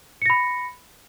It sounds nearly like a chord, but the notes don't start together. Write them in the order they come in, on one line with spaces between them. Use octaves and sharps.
C#7 A#6 B5